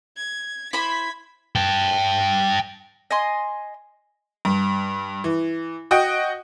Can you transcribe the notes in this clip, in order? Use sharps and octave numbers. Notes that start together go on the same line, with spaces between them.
G#6
E4 C5 B5 G#6 B6
G5 A5
D#5 G#5 C6
G2
E3
F#4 D#5 G5